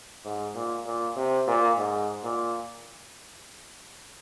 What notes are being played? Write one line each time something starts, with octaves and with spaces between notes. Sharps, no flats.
G#2
A#2
A#2
C3
A#2
G#2
A#2